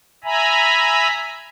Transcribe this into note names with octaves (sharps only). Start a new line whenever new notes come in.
E5 G#5 A#5 B5